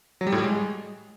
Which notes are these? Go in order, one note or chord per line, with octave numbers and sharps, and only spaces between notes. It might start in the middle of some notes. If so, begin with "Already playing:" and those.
F#3
G3
A2
G3
G#3